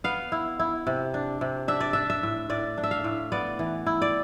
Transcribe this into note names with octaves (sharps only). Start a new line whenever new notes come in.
B3 F5
E4
E4
C3
D4
C3
D4 E5
D5
D4 E5
E5
A2
A2 D5
D4
E5
F5
A2
B3 D5
E3
E4
D5